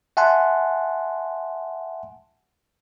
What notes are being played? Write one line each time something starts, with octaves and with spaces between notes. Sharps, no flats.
E5 F#5 G#5 A5 C6 F#6